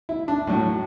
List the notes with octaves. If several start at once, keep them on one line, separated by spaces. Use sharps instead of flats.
E4
D4
A2 F#3